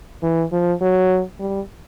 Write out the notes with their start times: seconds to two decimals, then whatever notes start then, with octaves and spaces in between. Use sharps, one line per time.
0.23 E3
0.53 F3
0.81 F#3
1.40 G3